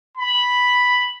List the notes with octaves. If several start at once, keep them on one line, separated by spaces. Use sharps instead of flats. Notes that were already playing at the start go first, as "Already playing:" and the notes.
B5